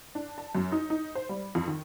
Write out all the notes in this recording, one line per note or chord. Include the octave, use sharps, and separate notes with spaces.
D4
A5
F#2
D#4
D#4
C5
G3
F2
D#3